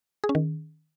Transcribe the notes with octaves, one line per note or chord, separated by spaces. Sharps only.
G#4
C#4
D#3